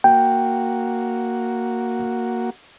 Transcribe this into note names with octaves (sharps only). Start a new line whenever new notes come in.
A#3 F#4 G5